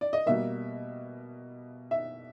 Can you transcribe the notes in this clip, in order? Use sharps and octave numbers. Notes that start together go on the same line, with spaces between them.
D5
D#5
B2 G3 A#3 E5
E5